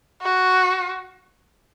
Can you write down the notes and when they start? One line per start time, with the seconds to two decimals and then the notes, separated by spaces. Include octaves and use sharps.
0.22 F#4